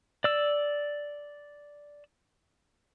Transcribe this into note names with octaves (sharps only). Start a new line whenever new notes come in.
D5 E6